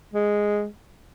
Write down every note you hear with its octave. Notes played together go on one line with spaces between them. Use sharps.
G#3